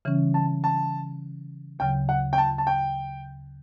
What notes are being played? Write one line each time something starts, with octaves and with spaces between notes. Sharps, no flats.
C#3 E3 G3 C#4
A5
A5
D2 C#3 F#3 G5
F#5
G5
A5
A5
G5